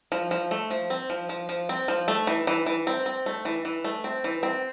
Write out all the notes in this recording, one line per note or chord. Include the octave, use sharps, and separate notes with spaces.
F3
F3
A3
F3
C4
F3
F3
F3
C4
F3
A3
E3
E3
E3
C4
C4
A3
E3
E3
A3
C4
E3
C4